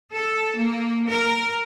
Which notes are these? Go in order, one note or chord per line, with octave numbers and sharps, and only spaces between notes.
A4
A#3
A#4